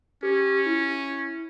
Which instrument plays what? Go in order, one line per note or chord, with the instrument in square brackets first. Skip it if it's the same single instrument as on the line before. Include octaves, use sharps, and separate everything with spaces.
[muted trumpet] C#4 [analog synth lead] G4
[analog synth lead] E4